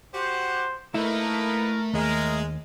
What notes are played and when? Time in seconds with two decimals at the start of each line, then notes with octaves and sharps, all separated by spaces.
0.14 F#4 G4 C5 F#5
0.94 A3 A#3 D#4 E4 A#4 B4
1.94 D#2 G#3 A#4